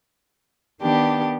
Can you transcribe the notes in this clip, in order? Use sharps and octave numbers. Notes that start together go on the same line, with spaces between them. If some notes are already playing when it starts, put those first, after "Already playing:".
D#3 B3 D4 G4